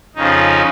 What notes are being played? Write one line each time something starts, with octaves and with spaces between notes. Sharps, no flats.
F2 C#3 F3 D#4